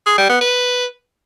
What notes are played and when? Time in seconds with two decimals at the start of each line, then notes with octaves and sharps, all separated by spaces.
0.06 G#4
0.18 G3
0.29 B3
0.41 B4